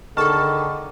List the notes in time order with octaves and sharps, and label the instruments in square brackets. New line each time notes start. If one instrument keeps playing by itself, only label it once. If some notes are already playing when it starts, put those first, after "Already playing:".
[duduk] D3 [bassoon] D#3 [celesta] G#4 C#6 F6 [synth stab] A4 A5